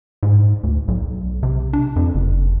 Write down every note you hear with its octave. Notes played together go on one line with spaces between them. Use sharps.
G#2
D2
B1
C3
D4
F2
F#1